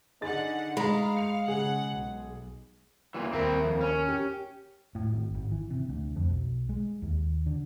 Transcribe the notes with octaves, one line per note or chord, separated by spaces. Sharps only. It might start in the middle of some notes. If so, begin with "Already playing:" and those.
D3 D#4 G#4 F#5 A6
G#3 F5 A#5 B5
C#7 F7
C#3 G#4 F#5
B1
E2 A#2 E3
D#2 C4 E4 A#4
F2
C#4
G4
A2
G#1
G#1
E3
C3
D2
F2
B1
G#3
D#2
D3